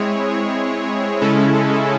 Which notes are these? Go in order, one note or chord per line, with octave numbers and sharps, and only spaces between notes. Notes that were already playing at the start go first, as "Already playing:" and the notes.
Already playing: G#3 C4 E4 G#4 C#5
C#3 G#3 C#4 E4 A4